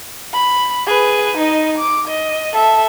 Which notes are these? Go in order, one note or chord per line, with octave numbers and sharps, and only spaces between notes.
B5
G#4 B4
D#4 D#5
D6
D#5
A4 E5